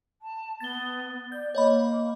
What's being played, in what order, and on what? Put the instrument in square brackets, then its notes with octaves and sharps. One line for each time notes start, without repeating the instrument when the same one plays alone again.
[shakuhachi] A5
[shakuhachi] B3 [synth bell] A6 G7
[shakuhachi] D5 [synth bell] G6
[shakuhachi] A#3 [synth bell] C#5 D#5 B5